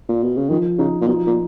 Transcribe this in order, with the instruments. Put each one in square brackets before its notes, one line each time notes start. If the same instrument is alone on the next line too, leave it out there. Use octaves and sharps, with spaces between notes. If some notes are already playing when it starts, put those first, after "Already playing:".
[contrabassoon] A#2
B2
C#3
[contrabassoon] D#3 [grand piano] F3
[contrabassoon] C#3 [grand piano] D#4
[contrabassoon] A#2
[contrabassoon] B2 [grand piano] F3
[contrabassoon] A#2